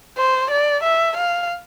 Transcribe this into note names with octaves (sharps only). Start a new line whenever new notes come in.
C5
D5
E5
F5